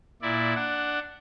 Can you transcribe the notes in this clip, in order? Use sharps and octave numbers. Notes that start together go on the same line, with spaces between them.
A#2 E4 D5
D4 F#5